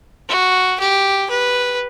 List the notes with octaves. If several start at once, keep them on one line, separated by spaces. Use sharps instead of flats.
F#4
G4
B4